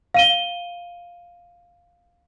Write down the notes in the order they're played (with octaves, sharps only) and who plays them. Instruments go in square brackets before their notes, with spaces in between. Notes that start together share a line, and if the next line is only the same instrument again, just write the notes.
[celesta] F5 D#7 G7